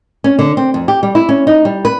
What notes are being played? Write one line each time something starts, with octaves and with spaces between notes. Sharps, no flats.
C#4
D3
C4
F2
G4
G3
E4
C#4
D#4
G3
B4